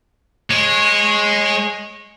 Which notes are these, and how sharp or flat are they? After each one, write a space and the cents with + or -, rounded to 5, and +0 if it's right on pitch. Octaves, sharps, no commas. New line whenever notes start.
G#3 +0 C#5 -25